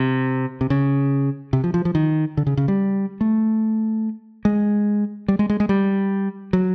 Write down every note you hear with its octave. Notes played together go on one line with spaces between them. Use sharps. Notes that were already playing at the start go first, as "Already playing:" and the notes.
Already playing: C3
C3
C#3
C3
F3
F3
F3
D#3
D3
C#3
C#3
G3
A3
G#3
G3
G#3
G#3
G#3
G3
F#3